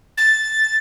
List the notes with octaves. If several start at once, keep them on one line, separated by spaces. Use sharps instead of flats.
A6